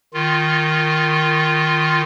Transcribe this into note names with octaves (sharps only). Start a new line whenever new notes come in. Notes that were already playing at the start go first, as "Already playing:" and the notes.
D#3 F4